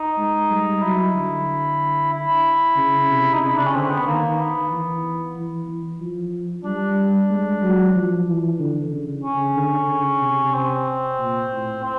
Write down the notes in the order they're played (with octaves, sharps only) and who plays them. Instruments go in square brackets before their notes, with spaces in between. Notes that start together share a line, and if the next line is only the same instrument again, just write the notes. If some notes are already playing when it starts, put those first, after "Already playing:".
Already playing: [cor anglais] D#4
[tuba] G#3
G3
[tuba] F#3 [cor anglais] E4
[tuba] D3
[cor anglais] E4
[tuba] C#3
C3
[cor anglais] D#4
[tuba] C#3 [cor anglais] E4
[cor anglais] D4
C#4
[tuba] D3 [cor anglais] C4
[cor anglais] B3
[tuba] D#3 [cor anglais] A#3
[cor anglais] B3
[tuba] E3
E3
E3
F3
[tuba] G3 [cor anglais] D4
[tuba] G#3
F#3
F3
E3
D3
C#3
[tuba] C#3 [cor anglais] C#4
[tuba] D3
C#3
C3
[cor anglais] C4
[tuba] A#2
A2
[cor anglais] C4